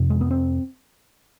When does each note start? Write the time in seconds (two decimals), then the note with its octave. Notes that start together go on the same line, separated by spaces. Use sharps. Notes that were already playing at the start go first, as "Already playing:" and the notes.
Already playing: F2 C3
0.10 G#3
0.21 B3
0.31 C4